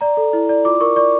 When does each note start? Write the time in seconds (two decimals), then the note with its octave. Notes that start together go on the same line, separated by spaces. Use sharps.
0.01 D5 A#5
0.17 A4
0.33 E4
0.49 D5
0.65 F4 D6
0.81 A#4 C#6
0.96 D5 C#6